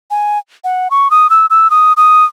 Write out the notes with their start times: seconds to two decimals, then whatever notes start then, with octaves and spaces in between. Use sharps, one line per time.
0.11 G#5
0.64 F#5
0.91 C#6
1.11 D#6
1.30 E6
1.50 E6
1.70 D#6
1.97 D#6